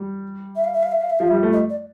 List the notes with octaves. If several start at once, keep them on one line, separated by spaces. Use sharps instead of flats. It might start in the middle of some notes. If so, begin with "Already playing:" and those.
Already playing: G3
E5
F5
E5
F5
E5
F5
E5
F3 F5
E5
G3
A3
D#5
D5